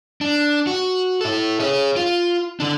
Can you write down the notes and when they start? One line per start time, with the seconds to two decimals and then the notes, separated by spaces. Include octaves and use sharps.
0.21 D4
0.67 F#4
1.21 E4 A4
1.60 G#4 C#5
1.96 F4
2.60 D3 D4